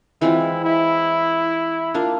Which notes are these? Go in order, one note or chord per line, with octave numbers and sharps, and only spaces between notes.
E3 G#3 C4 E4 F4
E4
A#3 D4 F4